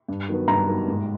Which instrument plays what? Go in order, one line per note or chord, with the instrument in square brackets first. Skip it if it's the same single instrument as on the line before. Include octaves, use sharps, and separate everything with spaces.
[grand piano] G2
D#3 F#3 B3
[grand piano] G2 [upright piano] A#5
[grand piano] D#3 F#3 B3
G#2